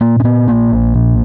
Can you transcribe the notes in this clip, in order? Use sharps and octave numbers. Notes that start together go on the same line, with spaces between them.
A#2 A#3
C#4
A#2 B3
A#1 A#3
A#1
A#2